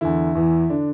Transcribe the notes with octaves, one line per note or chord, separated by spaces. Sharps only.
E2 D3 E4
E2 E3
D3 D4